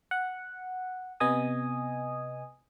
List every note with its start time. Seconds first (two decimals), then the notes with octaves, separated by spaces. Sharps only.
0.11 F#5
1.20 C3 B3 D#5 G#5 D#6